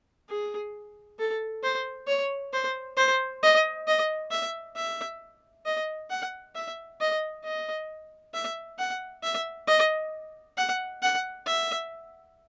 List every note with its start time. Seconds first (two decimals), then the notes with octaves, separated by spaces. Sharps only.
0.29 G#4
1.19 A4
1.63 C5
2.07 C#5
2.53 C5
2.97 C5
3.43 D#5
3.87 D#5
4.31 E5
4.76 E5
5.65 D#5
6.10 F#5
6.55 E5
7.00 D#5
7.44 D#5
8.34 E5
8.78 F#5
9.23 E5
9.67 D#5
10.57 F#5
11.02 F#5
11.46 E5